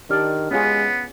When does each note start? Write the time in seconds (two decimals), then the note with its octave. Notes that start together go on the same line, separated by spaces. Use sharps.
0.10 D#3 D4 G4 D5 F6
0.51 G#3 B3 C#4 F4 G#4